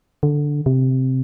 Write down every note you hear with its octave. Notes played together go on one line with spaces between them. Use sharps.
D3
C3